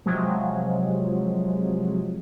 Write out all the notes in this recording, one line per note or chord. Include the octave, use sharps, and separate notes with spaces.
C3 F3 F#3 G#3